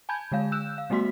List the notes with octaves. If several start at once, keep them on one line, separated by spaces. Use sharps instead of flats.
G#5 A5 B5 G6 G#6
D3 G#3 F5 G6
E6 F#6 G6 E7
F5
G3 A3 B3 F#4 C6 B6